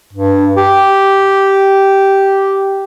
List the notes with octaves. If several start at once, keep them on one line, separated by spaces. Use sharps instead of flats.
G2
G4